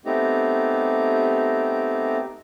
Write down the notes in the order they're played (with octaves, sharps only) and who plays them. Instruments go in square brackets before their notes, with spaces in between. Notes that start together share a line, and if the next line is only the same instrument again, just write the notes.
[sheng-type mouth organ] A3 B3 C4 D#4 G4 A#5